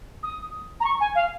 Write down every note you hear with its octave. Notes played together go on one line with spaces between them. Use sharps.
D#6
A#5
C#6
G#5
F5